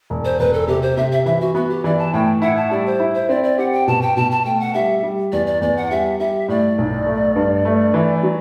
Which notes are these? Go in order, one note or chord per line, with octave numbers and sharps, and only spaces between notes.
E1
C5
E1 B4
A4
C3 G4
C5
C3 E5
E5
E3 E5
F#4
B3 F#4
G4
E3 D5
A5
A2 G5
E4 F#5
A5
G3 D5
C5
E4
C5
C4 D5
D5
G4 F#5
G5
B2 A5
G5
B2 A5
A5
A3 G5
F#5
G3 E5
G3
E2 D5
D5
E2 D5
F#5
G3 E5
G3 E5
A2 D5
B1
A3
G2
A3
E3
F#3